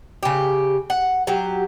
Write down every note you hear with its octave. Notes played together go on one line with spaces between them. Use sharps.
C#3 G4
F#5
F#3 G4